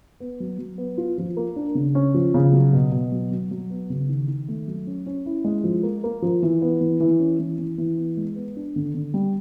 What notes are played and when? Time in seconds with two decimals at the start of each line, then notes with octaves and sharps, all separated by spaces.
0.20 B3
0.40 F#3
0.59 F#3
0.78 B3
0.98 F4
1.18 F3
1.37 A#3
1.56 D4
1.75 C#3
1.95 C#4
2.14 F3
2.34 C#3
2.53 F#3
2.73 B2
2.92 B2
3.12 F#3
3.31 F#3
3.51 F#3
3.70 B3
3.90 C#3
4.09 D#3
4.28 D#3
4.48 A3
4.67 F#3
4.87 C#4
5.06 C#4
5.26 E4
5.44 G#3
5.64 F3
5.83 A#3
6.04 A#3
6.22 F3
6.42 E3
6.62 B3
6.81 E3
7.00 E3
7.20 C#4
7.39 E3
7.59 E3
7.78 E3
7.98 B3
8.17 G#3
8.36 B3
8.56 D4
8.76 D3
8.94 D3
9.14 G3